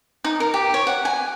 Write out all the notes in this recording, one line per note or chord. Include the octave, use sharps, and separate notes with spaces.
D#4
A#4
G4
C#5
F#5
G#5